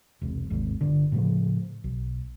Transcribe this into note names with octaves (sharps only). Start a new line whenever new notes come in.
E1 C2
G#1 D#2
G1 D3
A2 C#3 F3
B1